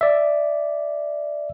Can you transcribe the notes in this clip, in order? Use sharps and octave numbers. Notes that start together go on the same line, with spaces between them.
D5 E5